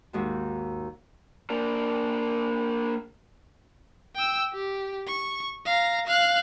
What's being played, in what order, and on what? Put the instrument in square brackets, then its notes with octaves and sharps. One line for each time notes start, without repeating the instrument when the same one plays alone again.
[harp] D#2 G#2 F#4
[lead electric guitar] A#3 D4
[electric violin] G5 E6
G4
C#6
F5 A#5
F5 F#6